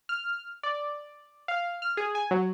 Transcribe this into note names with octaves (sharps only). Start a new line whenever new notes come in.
F6
D5
F5
F6
G#4
G#5
F#3